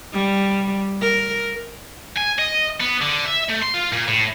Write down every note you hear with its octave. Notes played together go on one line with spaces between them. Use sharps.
G3
A#4
G#5
D#5
B3
D3
E5
A3
C6
F4
A#2
A2